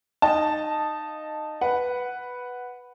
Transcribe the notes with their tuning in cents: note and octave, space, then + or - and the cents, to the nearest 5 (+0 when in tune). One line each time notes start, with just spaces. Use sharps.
D#4 -10 F5 +0 A5 +0
B4 +0 F#5 +0